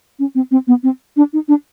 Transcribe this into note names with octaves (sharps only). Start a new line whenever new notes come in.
C#4
C4
C4
B3
C4
D4
D#4
D4